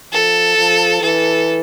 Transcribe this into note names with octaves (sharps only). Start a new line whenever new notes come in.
F3 A4
F3
E3 A4